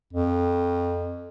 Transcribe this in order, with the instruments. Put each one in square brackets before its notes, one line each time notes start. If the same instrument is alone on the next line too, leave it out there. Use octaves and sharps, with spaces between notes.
[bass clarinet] F2